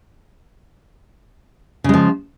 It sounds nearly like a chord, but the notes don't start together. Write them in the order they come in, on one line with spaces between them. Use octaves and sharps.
C#3 G#3 F3